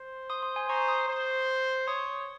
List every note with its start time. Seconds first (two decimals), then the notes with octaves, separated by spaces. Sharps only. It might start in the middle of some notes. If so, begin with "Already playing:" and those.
Already playing: C5
0.30 C6 D#6
0.42 C6 D#6
0.56 G#5 C6
0.69 C5 A#5 C#6
0.88 C6 D#6
1.08 C5
1.87 C#5 C6 D#6